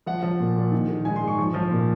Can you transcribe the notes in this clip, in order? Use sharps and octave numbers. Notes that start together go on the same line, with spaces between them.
F3 F#5
F3
A#2
A#2
D#3
D#3
G#2 G#5
C6
G#2
C#6
F3
F3
A#2